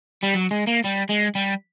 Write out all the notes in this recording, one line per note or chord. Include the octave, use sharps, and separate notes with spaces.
G3
F#3
G#3
A#3
G3
G#3
G3